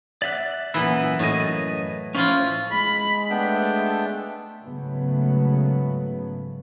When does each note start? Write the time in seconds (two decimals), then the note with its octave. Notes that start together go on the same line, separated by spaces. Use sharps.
0.22 D5 E5 F#5
0.74 F#2 A#2 E3 B3 E4
1.19 F#2 A2 D#5
2.15 F3 C#4 E4 F4
2.71 G#3 B5
3.30 A3 B3 D4 G5
4.62 G#2 C#3 F#3 A3 B3